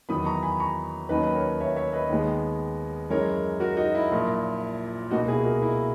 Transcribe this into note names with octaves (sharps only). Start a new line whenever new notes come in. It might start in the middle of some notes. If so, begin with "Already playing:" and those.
E2 D#3 F#3 B3 B5 D#6
A#5 C#6
G#5 B5
A#5 C#6
D#2 D#3 F#3 C#4 B4 D#5
B4
A#4 C#5
C#5 E5
C#5 E5
B4 D#5
D#2 D#3 G#3 B3
F#2 E3 G#3 A#4 C#5
F#4 A#4
D#4 F#4
E4
A#1 A#2 F#3
C#2 B2 A#3 D#4 F#4
E4 G#4
F#4 A#4
E4